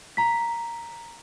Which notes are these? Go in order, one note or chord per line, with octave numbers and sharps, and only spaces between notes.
A#5 B6